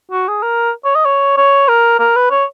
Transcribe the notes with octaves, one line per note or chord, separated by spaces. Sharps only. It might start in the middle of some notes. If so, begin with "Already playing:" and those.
F#4
G#4
A#4
C#5
D#5
C#5
C#5
A#4
A#4
B4
C#5